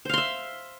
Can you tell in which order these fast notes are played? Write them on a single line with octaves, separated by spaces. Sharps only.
C5 F5 C6 E5